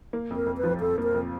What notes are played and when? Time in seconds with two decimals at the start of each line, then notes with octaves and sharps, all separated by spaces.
0.13 A#3
0.30 F2
0.36 A#4
0.46 F2
0.58 B4
0.64 F3
0.80 F2 A4
0.98 A#3
1.03 A#4
1.14 F2